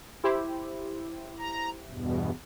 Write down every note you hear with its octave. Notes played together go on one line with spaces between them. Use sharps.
E4 G4 C5
A#5
E2 G2 B2